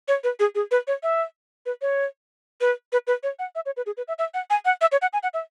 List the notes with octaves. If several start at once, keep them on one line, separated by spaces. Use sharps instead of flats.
C#5
B4
G#4
G#4
B4
C#5
E5
B4
C#5
B4
B4
B4
C#5
F#5
E5
C#5
B4
G#4
B4
E5
E5
F#5
G#5
F#5
E5
C#5
F#5
G#5
F#5
E5